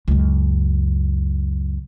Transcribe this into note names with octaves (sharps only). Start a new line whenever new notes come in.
C#2 F#2